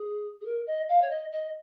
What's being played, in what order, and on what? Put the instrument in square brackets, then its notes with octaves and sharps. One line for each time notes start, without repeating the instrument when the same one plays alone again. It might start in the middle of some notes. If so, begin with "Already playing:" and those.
Already playing: [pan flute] G#4
G#4
A#4
D#5
F5
C#5
D#5
D#5